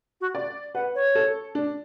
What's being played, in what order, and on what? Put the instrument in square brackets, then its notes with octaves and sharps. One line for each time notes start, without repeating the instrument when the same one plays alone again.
[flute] F#4
[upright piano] D5
[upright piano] B4 [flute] F#5
[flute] C#5
[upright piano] A4
D4